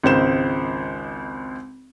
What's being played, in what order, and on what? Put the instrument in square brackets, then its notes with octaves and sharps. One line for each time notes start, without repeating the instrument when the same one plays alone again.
[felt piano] G#1 C#2 C5 E7